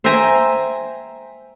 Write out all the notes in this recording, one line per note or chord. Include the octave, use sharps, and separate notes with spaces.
C5 E5 G5 G#5 A#5